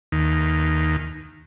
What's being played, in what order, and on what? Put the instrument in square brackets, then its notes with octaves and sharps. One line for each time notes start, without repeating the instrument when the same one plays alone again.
[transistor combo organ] D#2